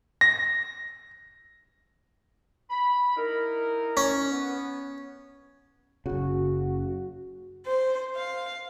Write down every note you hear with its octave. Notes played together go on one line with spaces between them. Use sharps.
A#6
B5
D#4 E4 A#4
C#4
B3
F#1 C#3 F#4
C5
F5